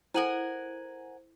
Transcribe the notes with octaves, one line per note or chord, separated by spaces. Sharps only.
E4 A4 A#4 C5 F#5 G#5 D#7 F#7